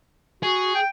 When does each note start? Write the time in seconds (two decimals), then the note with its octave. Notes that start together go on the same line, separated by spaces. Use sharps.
0.43 F#4 G#4
0.75 G5